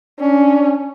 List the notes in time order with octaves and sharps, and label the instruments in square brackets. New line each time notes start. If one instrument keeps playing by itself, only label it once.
[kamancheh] C#4 [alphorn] D4